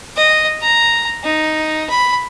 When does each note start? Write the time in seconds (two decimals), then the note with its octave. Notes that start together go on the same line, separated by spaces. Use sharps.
0.17 D#5
0.62 A#5
1.24 D#4
1.90 B5